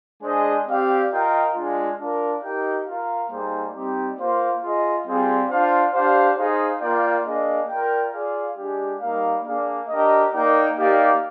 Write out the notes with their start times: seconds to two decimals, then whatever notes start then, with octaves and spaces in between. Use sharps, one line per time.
0.21 G#3 D4 G#4 C5 D#5
0.66 C4 G4 D5 F5
1.10 F4 A#4 D#5 G5
1.54 G#3 D4 F4
1.98 D4 F4 A#4
2.41 D#4 G4 A#4 D#5 G5
2.86 F4 A#4 F5
3.29 G3 A#3 D#4 G#4 C5
3.73 G3 C4 D#4 G4
4.17 A#3 F4 C5 F5
4.61 F4 G#4 D#5
5.06 G3 C4 F4 G#4
5.50 D4 F4 C5 F5
5.93 D4 G4 C5 F5
6.37 D#4 G#4 C5 F5
6.81 A#3 F4 A#4 D5 G5
7.25 A#3 D4 G#4 D#5
7.68 F4 A#4 D5 G5
8.13 F4 G#4 D5 F5
8.57 G#3 D4 G4
9.01 G3 A#3 D#4 A#4 F5
9.45 A#3 D4 G#4 D5 F5
9.88 D4 G4 A#4 D#5
10.33 A#3 D#4 A#4 D5 G5
10.76 A#3 D#4 G4 D5 F5